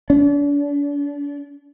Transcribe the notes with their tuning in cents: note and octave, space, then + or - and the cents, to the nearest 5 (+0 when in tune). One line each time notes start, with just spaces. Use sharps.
D4 -40